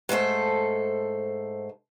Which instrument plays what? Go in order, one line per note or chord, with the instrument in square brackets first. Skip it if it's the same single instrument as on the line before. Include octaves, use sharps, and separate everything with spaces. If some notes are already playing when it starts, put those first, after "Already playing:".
[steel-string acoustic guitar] G#2 A3 A4 C5